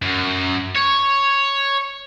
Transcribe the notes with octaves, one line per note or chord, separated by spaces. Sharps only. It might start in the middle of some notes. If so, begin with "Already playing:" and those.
F#2
C#5